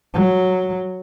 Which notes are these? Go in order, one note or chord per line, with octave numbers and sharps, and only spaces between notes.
F#3